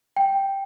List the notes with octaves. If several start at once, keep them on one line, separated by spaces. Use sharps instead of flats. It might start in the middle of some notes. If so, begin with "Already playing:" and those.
G5